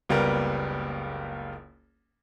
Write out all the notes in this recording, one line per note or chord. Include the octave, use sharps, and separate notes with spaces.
F#1 C#2 G3 A#3 B3 A#4